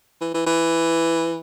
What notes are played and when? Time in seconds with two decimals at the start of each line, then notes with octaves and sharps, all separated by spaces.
0.21 E3
0.34 E3
0.47 E3